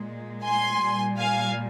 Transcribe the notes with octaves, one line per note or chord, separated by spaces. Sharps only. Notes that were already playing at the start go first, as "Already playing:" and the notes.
Already playing: A#2 G#3
G#5 C6
A#2 G3
F5 G#5